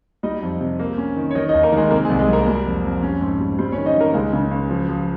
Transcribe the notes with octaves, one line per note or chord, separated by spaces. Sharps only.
G3 D#4 D#5
F2
C3
A#3
C#4
D#3
C#5
D#3 D#4 D#5
D#4 D#5
D#2
A#3 A#4
D#3 G#3 G#4
C3 A#3 A#4
G#3 G#4
C2
G#3 G#4
C2 A#3 A#4
G3
F2
F2
C#4
G#2
G3
G3 C4 C5
C#4 C#5
D#3
D#4 D#5
D#3 A#3 A#4
C#2 G#3 G#4
C#3
C#2
F3
F3